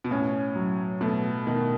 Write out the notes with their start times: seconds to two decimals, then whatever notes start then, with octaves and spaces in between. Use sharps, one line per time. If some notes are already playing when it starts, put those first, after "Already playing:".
0.04 B2
0.11 A2 C#4
0.56 F#3
1.01 B2 A3
1.47 B2 D#3